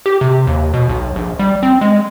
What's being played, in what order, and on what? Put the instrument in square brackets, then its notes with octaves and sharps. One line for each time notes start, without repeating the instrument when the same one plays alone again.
[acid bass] G4
C3
D#2
B2
B1
A#1
G3
C4
G#3